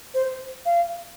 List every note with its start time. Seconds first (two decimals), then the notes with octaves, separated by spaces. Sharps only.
0.14 C5
0.66 F5